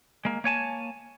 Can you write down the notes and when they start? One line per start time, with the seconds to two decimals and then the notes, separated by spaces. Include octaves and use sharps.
0.25 G#3 A#3
0.44 A#3 C#5 G#5 A5